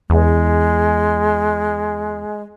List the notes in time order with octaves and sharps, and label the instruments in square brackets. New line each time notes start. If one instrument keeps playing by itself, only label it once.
[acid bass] E2 [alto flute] G#3